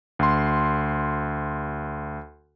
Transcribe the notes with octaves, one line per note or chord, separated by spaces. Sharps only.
D2 C6